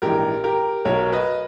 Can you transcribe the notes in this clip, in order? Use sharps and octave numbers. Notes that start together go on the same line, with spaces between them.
A#1 G#2 E3 G4 A#4
G4 A#4
B1 B2 A#4 C#5
B4 D#5